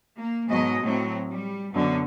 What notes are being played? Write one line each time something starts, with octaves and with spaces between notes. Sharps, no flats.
A#3
G#2 B2 F#3 D#5
A2 F#3 C4
G3
F#2 B2 D3